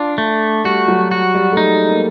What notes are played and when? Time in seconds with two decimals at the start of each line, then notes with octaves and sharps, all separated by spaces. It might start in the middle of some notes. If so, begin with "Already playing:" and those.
Already playing: D4 F4
0.18 A3
0.64 G3 F#4
0.88 F#3
1.11 F#4
1.35 G3
1.52 A3
1.57 G#3 D#4
1.89 A#3